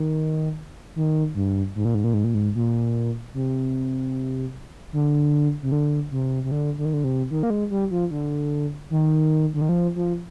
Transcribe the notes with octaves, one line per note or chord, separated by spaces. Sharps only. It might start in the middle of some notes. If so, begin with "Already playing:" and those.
Already playing: D#3
D#3
G2
G#2
A#2
G#2
A#2
G#2
A#2
G#2
A#2
C3
D3
C3
D3
C3
C3
D3
D3
D#3
D3
C3
D#3
A#3
G#3
G3
F3
D3
D#3
D3
D#3
F3
F3